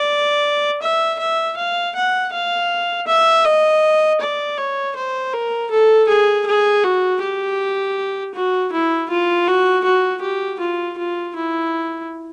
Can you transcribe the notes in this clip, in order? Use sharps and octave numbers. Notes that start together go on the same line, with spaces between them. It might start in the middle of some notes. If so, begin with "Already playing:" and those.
Already playing: D5
E5
E5
F5
F#5
F5
E5
D#5
D5
C#5
C5
A#4
A4
G#4
G#4
F#4
G4
F#4
E4
F4
F#4
F#4
G4
F4
F4
E4